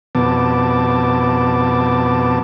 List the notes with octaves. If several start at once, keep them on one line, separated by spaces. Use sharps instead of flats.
F2 B2 B3 A5 D6